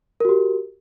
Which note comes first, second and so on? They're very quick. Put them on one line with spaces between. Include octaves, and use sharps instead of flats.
A#4 F#4 G4